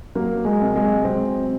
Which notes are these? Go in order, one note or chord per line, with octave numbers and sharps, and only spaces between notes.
F#3 A#3
G#3
C3
G#3
F#3 C4